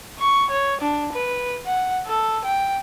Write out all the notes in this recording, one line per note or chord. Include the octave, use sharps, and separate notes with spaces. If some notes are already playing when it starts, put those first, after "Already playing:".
C#6
C#5
D4
B4
F#5
A4
G5